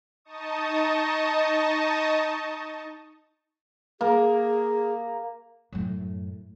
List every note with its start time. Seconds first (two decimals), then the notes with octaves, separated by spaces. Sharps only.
0.25 D#4 D#5 A5 C#6 D#6
4.01 A#3 G#4
5.72 F#2 A2